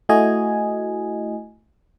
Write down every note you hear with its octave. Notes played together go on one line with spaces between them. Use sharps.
A3 E4 F#4 D#5 G#5